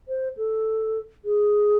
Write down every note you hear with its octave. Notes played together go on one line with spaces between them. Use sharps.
C5
A4
G#4